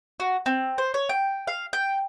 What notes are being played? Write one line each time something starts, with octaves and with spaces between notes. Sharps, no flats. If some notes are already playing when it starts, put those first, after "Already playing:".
F#4
C4
C5
C#5
G5
F5
G5